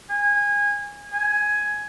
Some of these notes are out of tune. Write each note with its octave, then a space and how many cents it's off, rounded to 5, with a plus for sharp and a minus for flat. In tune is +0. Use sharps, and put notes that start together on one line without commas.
G#5 -20
G#5 +10